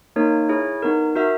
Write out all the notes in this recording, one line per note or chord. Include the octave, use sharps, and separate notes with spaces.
A#3 D#4 A#4 C#5
E4 G#4 C#5
B3 D#4 A#4
F#4 A#4 E5